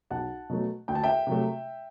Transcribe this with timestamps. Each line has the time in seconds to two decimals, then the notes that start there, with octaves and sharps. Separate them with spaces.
0.10 B1 F#5 A5
0.49 B2 F#3 A3
0.88 D2 G5
0.95 A5
1.04 E5 G5
1.27 C3 F#3 A3